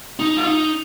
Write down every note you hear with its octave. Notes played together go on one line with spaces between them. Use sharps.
D#4
F4
D#4